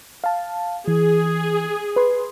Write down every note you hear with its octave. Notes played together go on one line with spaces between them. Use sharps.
F5 A5
E3 G#4
B4 C6